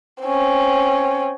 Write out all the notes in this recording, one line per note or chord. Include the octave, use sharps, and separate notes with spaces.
C4 C#4